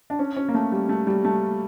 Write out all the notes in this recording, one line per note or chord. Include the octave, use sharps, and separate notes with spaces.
D4
C#4
C#4
A#3
A3
G3
A3
G3
A3